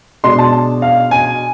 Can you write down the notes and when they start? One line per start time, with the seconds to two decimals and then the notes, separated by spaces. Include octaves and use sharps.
0.24 B2 G#3 D4 C6
0.38 A5
0.82 F5
1.11 G#5